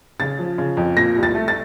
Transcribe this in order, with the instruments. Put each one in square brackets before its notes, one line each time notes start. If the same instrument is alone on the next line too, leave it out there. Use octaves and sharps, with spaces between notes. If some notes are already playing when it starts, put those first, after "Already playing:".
[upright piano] C#3 A6
F3
C#3
F2
A#2 A#6
C2
A6
A3
A6